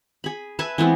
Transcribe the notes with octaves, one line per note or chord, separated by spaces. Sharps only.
G#4 B5
B4 E5 G#5 A5
E3 G#3 B3 C4